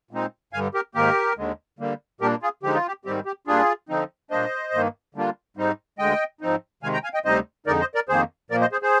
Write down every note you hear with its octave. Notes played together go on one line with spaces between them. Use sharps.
A#2 G#3 C4 D#4
G2 D3 G3 F5 G#5
G4 A#4
G#2 D#3 A#3 G4 A#4
D#2 D3 G#3
D3 G3 A#3
A#2 G3 A#3 D4 G4 A#4
F4 G#4
D3 F3 G#3 D#4 G4
F4
G4
G#2 D#3 G3 C4 G4
G4
A#2 G3 D4 F4 G#4
D3 F3 C4 D#4
A#2 G3 A#3 D4 C5 D#5
G2 D#3 A#3
D3 G3 A#3 D4 F4
G#2 G3 C4 D#4
D2 D3 G#3 D#5 G5
G#2 F3 C4 D#4
C3 D#3 G#3 F5 G#5
G5 A#5
F5 G#5
D#5 G5
D2 C3 G3 C4 D#4 C5 D#5
F2 D3 G#3 D#4 A#4 D5
C5 D#5
A#4 D5
F2 D#3 A#3 G#4 C5
A#2 F3 A#3 A#4 D5
C5 D#5
G#4 C5
G#4 C5